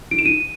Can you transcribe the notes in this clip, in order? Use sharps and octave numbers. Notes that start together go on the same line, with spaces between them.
D7
E7
D#7